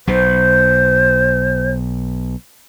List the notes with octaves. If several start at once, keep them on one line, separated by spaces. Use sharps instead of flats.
B1 B2 C5